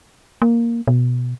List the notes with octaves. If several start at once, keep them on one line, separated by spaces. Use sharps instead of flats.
A#3
B2